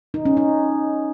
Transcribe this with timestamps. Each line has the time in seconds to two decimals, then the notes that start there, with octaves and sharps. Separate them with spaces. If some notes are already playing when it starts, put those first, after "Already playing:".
0.14 D#4
0.25 C#4
0.37 D#4